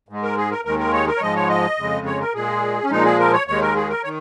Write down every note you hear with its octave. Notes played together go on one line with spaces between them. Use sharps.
G#2 G#3
A#4
G#4
A#4
D#2 D#3 G#3 A#4
A#4
C#5
A#4
C#5
G#2 F3 G#3 D#5
C#5
D#5
F2 C#3 G#3
C#5
A#4
A#2 G#3 G#4
C#4
A#2 F3 G#3 D#4
G#4
A#4
C#5
D#2 D#3 G#3 C#5
A#4
G#4
A#4
D#3 C#5